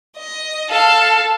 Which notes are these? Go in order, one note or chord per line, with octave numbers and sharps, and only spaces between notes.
D#5
A4 F5